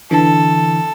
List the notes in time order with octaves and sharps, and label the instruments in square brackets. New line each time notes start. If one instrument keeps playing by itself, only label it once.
[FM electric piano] D3 E3 [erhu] A4